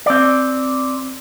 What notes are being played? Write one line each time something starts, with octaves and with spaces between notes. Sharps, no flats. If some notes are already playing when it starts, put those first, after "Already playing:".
C4 D5